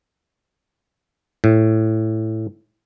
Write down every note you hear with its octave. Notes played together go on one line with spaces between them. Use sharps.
A2